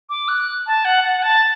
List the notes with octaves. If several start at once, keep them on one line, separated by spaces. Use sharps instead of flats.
D6
F#6
A5
F#5
F#5
A5